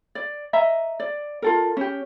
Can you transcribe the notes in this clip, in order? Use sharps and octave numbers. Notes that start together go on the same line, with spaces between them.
D5
D#5 E5 A#5
D5
F4 A4 A#4
C#4 G4